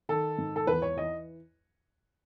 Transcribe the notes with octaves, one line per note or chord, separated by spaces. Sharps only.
D#3 A4
G#2
A4
E2 B4
C#5
E3 D#5